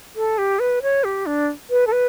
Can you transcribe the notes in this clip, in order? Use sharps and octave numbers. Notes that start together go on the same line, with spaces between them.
A4
G4
B4
C#5
G4
D4
B4
A4
B4